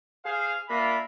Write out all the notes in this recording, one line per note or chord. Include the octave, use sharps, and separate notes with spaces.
G#4 C5 F5
A#3 D4 F4 E5 B5